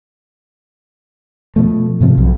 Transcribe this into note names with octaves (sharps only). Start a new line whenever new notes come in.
B2 F3 A3
G#2 C3 F3 C4
B1